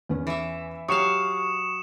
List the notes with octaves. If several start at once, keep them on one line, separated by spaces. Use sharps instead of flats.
E2 C#4
E3 E5
F#3 G4 F5 C#6 D#6 C#7 E7